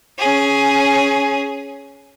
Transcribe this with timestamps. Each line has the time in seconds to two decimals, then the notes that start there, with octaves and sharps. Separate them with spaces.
0.19 C#4 G#4